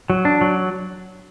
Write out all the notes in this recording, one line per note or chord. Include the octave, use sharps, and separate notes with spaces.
F#3
D4
F#3